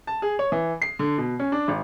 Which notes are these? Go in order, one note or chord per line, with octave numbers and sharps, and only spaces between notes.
A5
G#4
C#5
E3
C7
D3
B2
C#4
D4
G#1